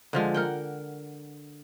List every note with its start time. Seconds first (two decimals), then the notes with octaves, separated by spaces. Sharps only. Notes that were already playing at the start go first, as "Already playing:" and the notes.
0.13 D3 F3 G#3
0.34 A#4 F#5 G5